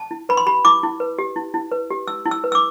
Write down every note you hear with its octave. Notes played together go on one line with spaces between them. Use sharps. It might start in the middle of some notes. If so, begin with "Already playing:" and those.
Already playing: A5
E4
B4 B5
C6
G4 B5
E4 D6
E4
B4
G4
E4
E4
B4
G4
E4 E6
E4
E6
B4
E6
D6